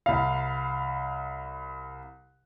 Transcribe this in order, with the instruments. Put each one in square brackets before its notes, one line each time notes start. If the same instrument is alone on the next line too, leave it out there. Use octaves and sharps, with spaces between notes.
[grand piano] C2 F5